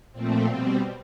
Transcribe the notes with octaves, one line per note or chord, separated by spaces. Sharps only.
A#2 F3 A3 C4
B2 G3 C4